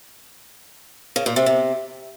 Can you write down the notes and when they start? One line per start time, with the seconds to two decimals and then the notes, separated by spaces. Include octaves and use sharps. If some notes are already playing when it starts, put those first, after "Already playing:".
1.16 C#3
1.26 A#2
1.36 C3
1.46 C3